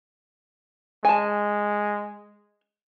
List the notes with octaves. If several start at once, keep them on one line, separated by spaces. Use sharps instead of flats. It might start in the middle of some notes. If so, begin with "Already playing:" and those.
G#3 G#5 A5